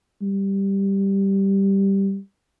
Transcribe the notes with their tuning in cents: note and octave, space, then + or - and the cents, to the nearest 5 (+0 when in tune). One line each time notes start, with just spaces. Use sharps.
G3 +0